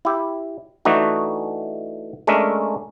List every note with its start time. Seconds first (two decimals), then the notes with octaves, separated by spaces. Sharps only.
0.05 E4 G4
0.85 E3 A3 D4 D#4 F#4
2.27 G#3 A3 C#4 D4 A#4 E5